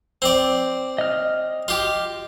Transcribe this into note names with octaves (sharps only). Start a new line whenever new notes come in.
C4 D5
D#5 F6
F4 G4